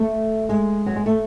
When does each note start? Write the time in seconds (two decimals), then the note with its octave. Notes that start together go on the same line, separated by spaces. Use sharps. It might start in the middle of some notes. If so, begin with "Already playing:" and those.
Already playing: A3
0.49 G#3
0.86 F#3
0.96 G#3
1.06 A3